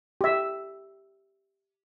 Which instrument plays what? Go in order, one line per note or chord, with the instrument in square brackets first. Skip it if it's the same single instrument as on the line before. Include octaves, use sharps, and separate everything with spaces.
[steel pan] G4 E5